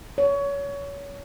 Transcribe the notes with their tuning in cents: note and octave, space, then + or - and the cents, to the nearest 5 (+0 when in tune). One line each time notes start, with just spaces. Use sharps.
C#5 +25